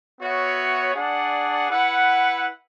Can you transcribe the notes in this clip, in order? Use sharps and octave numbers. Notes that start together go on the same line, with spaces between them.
B3 F#4 C#5 E5
D4 G#4 D5 F#5
E4 B4 F#5